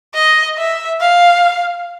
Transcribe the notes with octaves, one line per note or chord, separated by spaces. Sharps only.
D#5
E5
F5